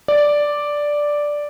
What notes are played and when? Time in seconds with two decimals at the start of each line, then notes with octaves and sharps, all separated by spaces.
0.08 D5